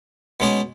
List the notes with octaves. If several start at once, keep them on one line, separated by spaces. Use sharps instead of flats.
B2 G#3 C#4 G#4